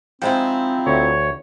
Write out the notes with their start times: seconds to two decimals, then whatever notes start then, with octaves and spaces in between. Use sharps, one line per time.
0.22 F3 G#3 C4 D#4 E4 G5
0.87 D2 C#5